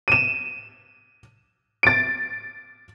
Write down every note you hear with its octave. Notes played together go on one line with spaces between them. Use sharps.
D#7 E7
A6 D7